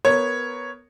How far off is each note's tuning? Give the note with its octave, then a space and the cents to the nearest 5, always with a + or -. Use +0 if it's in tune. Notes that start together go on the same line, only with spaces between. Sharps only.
B3 +0 A#4 -10 C#5 +0